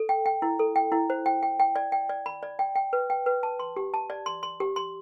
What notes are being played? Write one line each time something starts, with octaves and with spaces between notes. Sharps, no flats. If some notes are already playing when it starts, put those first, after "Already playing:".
Already playing: A4
G5
G5
E4
A4
G5
E4
C5
G5
G5
G5
D5
G5
D5
B5
D5
G5
G5
B4
G5
B4
A5
C6
G4
A5
D5
C6
C6
G4
C6